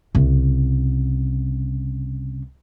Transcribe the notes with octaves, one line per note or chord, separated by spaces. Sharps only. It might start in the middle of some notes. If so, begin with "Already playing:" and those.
C2 C#3